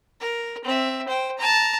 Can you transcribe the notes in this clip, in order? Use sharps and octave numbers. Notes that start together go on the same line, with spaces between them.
A#4
C4 E5
C5 G5
A5 A#5